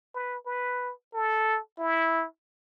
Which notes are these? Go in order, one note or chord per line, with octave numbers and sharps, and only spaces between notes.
B4
B4
A4
E4